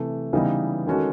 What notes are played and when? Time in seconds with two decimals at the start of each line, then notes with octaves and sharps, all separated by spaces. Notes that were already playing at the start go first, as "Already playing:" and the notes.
Already playing: C3 E3 A3
0.33 C#3 E3 G3 B3 D#4
0.87 D#3 G#3 C#4 F#4 A4